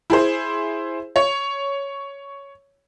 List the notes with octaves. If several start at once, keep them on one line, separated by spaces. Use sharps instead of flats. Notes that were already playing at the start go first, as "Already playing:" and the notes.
E4 G#4 C5
C#5